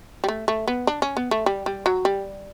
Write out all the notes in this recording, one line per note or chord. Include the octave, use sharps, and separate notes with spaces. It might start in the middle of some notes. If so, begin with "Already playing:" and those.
G3
A3
A3
B3
D4
C#4
B3
A3
G3
G3
F#3
G3